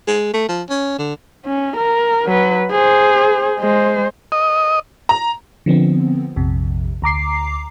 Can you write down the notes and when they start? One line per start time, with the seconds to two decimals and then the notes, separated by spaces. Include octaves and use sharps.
0.07 G#3
0.34 A3
0.48 F3
0.70 C#4
0.98 D3
1.46 C#4
1.77 A#4
2.27 F#3 B4
2.71 G#4 C5
3.60 G#3 C5
4.32 D#5
5.09 A#5
5.66 D3 F3 B3 C4
6.36 A#1 F2 C3
7.02 D2 A#5 D6 C7